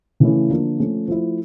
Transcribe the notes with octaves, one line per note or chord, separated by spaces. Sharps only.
C#3 E3 A3 C#4 E4
D3 F3 A#3 D4 F4
F3 A3 C#4
F3 A3 E4